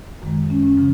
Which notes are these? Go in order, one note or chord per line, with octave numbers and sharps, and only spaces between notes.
F#2 D#3 G#3
C#4
C#4
C#3 F3